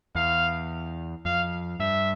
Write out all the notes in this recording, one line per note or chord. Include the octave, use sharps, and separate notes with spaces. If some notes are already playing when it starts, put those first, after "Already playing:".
E2 F5
F2 F5
G2 E5